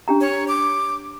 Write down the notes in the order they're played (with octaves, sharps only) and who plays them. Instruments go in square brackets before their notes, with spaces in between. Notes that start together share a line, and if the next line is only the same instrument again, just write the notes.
[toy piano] D4 G4 A#5
[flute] C#5
D6